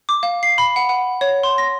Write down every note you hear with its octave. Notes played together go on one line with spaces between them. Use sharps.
D6
F5
C7
B5
F#5
F#5
C#5
C6
A#6